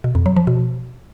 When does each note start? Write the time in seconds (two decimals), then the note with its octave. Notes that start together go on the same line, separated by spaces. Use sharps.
0.04 B2
0.15 F2
0.26 F#3
0.36 F3
0.47 B2